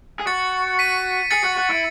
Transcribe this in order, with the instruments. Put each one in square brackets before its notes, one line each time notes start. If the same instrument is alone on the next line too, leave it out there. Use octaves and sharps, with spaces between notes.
[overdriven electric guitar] G#4
[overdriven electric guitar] F#4 [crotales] A6 C#7
[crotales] B6 D#7
[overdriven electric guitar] G#4 [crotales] A6 C#7
[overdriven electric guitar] F#4
F#4
E4